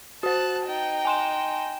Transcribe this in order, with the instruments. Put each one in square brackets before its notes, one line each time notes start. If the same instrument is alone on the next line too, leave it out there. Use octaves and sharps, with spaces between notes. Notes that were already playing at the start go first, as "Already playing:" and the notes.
[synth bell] F#4 C5 [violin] A5 F#6
[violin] D#4 G5
[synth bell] G#5 C6 E7